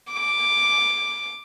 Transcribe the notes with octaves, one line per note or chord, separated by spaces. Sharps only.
D6